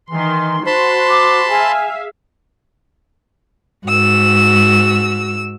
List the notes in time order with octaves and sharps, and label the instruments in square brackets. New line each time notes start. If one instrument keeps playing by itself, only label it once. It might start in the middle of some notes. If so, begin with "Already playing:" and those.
[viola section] D#3 C6 [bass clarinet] E3
[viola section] F#4 [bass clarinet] C5 [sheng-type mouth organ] A5 B5 C6
[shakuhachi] D6
[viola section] G#4 E5 F5 [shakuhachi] G#5
[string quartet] G#2 F#4 E6